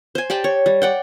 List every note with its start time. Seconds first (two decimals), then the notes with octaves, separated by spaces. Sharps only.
0.15 C5 G#5
0.30 G4 D5 G5 A5
0.44 C#5
0.66 G3
0.82 D5 F#5 G5